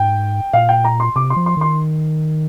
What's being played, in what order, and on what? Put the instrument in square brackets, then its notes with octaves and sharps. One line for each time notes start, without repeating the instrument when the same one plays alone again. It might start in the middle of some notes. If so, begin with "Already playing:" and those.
Already playing: [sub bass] G#2 [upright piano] G5
[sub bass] A#2 [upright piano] F5
[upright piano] G5
A#5
C6
[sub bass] C3 [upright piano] D6
[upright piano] C6
[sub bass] F3
[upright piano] C6
[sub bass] D#3 [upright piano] C6